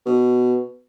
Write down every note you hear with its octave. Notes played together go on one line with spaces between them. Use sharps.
B2